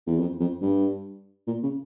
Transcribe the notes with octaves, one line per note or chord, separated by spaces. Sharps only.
E2
F2
F2
G2
A#2
C#3